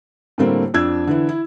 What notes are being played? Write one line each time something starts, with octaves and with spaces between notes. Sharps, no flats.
A2 D3 G3 A3 A#3 C4
F2 D4 E6 G#6
D3 E3 E4
E4